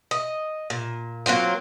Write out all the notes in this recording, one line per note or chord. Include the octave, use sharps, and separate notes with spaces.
D#5
A#2
F#3 A#3 C4 F4